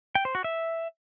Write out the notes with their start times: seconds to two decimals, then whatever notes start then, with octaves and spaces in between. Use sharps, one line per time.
0.15 G5
0.25 C5
0.35 F#4
0.44 E5